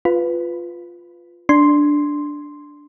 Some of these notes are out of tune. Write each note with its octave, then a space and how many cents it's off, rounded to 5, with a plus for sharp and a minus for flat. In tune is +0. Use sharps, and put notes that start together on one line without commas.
F4 +0 B4 +10
D4 +0 C6 +0